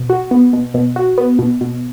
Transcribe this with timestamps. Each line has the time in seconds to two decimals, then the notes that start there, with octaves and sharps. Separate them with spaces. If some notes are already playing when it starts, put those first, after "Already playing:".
Already playing: B2
0.10 F#4
0.31 B3
0.53 B2
0.74 B2
0.96 F#4
1.18 B3
1.39 B2
1.61 B2